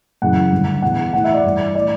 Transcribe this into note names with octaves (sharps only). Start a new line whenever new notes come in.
F#2 C#3 E3 F#5
G2 D3
E2 B2 F#5
A2 E3 F#5
E5
D5
G2 E3
A2 E3 D5